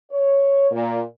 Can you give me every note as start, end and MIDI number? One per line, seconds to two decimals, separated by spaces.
0.12 0.70 73
0.71 1.01 46